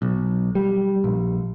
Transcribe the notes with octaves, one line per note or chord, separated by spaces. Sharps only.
B1
G3
A#1